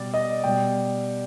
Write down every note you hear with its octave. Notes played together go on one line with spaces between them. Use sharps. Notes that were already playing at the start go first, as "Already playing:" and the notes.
Already playing: B2 G3 D5
D#5
B2 G3 G5